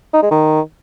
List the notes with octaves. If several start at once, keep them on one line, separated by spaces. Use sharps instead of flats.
D#4
G#3
D#3